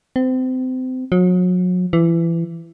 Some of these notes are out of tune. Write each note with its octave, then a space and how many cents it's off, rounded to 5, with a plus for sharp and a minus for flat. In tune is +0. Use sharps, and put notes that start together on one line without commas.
C4 -30
F#3 -35
E3 +25